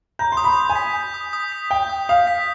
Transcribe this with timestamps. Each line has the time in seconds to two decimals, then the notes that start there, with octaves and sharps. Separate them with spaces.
0.19 A#5 G6
0.32 C6
0.37 D#6
0.44 B5
0.57 D#6
0.69 G#5
0.75 B6
0.95 G6
1.14 D#6
1.33 D#6
1.52 B6
1.71 G5 G6
1.90 D#6
2.09 F5 D#6
2.27 B6